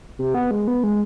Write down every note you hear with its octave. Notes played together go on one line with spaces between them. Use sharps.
C3
B3
G#3
B3
G#3